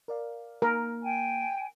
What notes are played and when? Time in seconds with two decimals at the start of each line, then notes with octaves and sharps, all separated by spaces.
0.08 A#4 D5 F5
0.62 A#3 A#4
1.01 G5 G#5